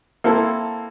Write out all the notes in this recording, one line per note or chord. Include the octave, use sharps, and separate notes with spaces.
A#3 C4 E4 A4